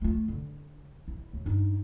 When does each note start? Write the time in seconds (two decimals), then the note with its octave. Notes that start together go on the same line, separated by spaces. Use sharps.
0.02 A3 F4
0.28 D3
1.08 E4
1.33 D#2
1.46 G2 D#4